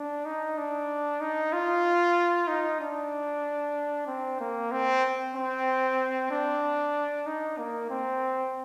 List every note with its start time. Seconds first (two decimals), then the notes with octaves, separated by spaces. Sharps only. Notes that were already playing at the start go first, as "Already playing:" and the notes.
Already playing: D4
0.25 D#4
0.58 D4
1.21 D#4
1.53 F4
2.48 D#4
2.81 D4
4.07 C4
4.40 A#3
4.72 C4
5.35 C4
6.31 D4
7.27 D#4
7.58 A#3
7.90 C4